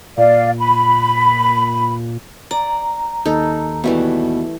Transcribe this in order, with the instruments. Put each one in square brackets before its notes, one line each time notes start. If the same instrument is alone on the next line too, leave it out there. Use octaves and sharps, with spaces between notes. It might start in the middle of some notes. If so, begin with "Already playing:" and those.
[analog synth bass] A#2 [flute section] D5 F5
[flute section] B5
[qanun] D5 [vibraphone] A#5
[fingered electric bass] D#2 [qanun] D#4 A4
[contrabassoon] B2 [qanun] E3 G3 A3